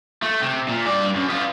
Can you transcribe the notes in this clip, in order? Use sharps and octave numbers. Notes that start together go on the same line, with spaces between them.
A3
C3
A#2
G2 D5
F#2
B3 F4